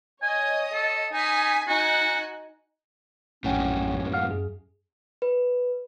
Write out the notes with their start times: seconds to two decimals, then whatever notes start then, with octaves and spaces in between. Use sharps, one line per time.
0.22 C#5 D#5 G#5 D#6
0.73 A4
1.13 D#4 G#5 B6
1.68 D#4 F#4 G#5 F#6
3.44 A#1 F#2 A2 C#4 F#5 G5
4.14 F5 F#5 F6
4.31 F#2 G#4
5.22 B4